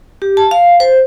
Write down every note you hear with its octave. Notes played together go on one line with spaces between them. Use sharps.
G4
A5
F5
C5